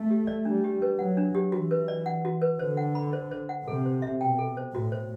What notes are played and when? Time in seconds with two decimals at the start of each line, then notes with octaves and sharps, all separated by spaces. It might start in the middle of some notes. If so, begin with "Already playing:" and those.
Already playing: A3
0.10 G4
0.27 D5
0.45 G3 D4
0.64 G4
0.82 B4
0.99 F#3 F#5
1.17 D4
1.35 G4
1.52 E3 F#4
1.71 B4
1.88 D5
2.06 F#5
2.25 F#4
2.42 B4
2.59 D3 C5
2.77 F#5
2.95 B5
3.13 C5
3.31 C5
3.49 F#5
3.67 C3 A4
3.86 C5
4.02 E5
4.20 B2 G5
4.38 A4
4.57 C5
4.74 A2 F#4
4.92 C5